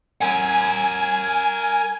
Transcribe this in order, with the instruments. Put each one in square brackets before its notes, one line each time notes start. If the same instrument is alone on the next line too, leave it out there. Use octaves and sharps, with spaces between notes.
[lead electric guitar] A#4 F#5 [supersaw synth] G#5